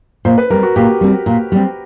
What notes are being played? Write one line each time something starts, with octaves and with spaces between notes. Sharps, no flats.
A#2 C5
B4
G3 C4 A#4
F#4
A#2 G4
G3 C4
A#2
G3 C4